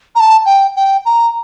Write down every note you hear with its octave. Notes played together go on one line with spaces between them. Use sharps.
A#5
A5
G5
G5
A#5